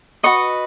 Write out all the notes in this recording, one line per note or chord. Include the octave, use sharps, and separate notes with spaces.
F#4 B4 D#5 C#6